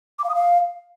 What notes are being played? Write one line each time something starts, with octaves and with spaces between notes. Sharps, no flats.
D6
F5
D#6
F5